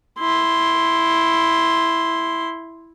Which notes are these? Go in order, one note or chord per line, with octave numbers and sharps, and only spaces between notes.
E4 C6